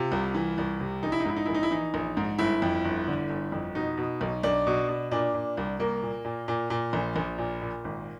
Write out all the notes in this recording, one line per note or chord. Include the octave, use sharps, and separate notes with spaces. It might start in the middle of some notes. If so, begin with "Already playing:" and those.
Already playing: C3 F4
C2
E3
C2
C3
A#1 D#4
E4
D#4
G#2 E4
D#4
A#1 E4
D#4
E4
E3 D#4
A#1
G#2
G1 E4
F2
G1
D3
G1
F2
B2 D#4
B2
B1
B1 D4
B2
B2
A#2 D4
A#2
C2
C2 A#3
A#2
A#2
A#2
A#2
A#1
A#1
A#2
A#2
G#1